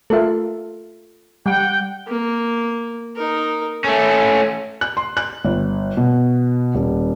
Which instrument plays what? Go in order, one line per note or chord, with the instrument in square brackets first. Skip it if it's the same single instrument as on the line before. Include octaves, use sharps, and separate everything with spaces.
[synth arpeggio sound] A3 A#4 E5 [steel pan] F4 A4
[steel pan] G3 [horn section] F#5 G5
[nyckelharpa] A#3
D#4 A#4
[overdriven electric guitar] A3 C#4 [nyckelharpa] A4
[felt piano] F#6
C6
F#6
G1
B2
D#1